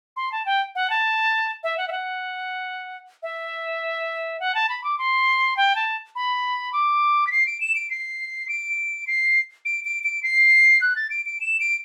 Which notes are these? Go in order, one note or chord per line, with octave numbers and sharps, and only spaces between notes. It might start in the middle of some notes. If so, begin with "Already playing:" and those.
C6
A5
G5
F#5
A5
E5
F#5
E5
F#5
E5
F#5
A5
B5
D6
C6
G5
A5
B5
D6
B6
C7
D7
E7
D7
C7
D7
C7
D7
D7
D7
C7
F#6
A6
D7
D7
E7
D7